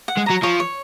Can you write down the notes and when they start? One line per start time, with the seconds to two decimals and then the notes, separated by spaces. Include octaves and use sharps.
0.08 F#5
0.17 G#3
0.26 F#3 A#5
0.43 F3 C#5
0.60 C#5